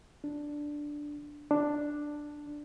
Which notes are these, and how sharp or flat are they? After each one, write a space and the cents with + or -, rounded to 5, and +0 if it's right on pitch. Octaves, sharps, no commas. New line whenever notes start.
D4 +0
D4 +5